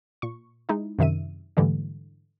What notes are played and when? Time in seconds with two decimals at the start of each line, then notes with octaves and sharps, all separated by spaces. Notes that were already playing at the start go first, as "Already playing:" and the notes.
0.22 A#2 C#6
0.69 G#3 D#4 E4
0.99 F#2 C3 D#3 E5 D#7
1.57 G#2 D3 E3 G3 A3